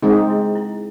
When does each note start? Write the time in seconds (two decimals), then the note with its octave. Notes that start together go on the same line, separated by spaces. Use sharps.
0.03 G#3 C4 D#4 G#4
0.30 E4
0.55 E4